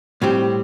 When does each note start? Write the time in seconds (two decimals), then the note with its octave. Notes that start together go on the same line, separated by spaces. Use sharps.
0.22 A2 G3 C4 G4